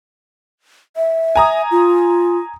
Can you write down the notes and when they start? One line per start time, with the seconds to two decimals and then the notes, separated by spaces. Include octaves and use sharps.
0.96 E5
1.36 G#5 A#5 D#6
1.71 F4